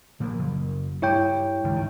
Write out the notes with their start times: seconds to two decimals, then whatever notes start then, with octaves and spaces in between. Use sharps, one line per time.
0.20 A#2 F3 A#3
0.39 F#1
1.02 G2 E4 C#5 G5
1.64 G#1 C#2 G2
1.76 D#3